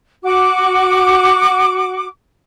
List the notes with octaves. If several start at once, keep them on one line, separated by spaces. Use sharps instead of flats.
F#4 D6